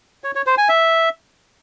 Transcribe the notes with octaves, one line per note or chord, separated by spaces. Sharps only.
C#5
C#5
C5
G#5
E5